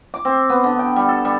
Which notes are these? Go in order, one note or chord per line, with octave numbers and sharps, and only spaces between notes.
D6
C4
B3
D3
G5
G3
A4
G3